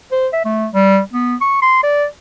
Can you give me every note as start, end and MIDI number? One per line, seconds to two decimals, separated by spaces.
0.11 0.28 72
0.33 0.41 76
0.45 0.67 57
0.74 1.00 55
1.13 1.36 59
1.41 1.61 85
1.62 1.82 84
1.83 2.05 74